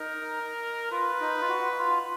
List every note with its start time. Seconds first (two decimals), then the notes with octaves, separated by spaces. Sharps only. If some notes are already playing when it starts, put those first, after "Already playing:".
Already playing: D#4 A#4
0.91 F4 B4
1.20 D#4
1.40 F4
1.48 F#4
1.78 F4